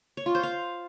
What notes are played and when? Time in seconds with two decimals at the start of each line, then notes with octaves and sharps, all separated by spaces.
0.17 C#5
0.26 F4
0.35 C5
0.43 F5